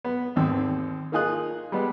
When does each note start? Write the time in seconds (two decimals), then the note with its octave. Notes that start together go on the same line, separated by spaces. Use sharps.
0.04 B3
0.36 G#1 D#2 C4 E6
1.12 A#3 D#4 F4 G#4 D#6 F#6
1.72 G3 G#3 B3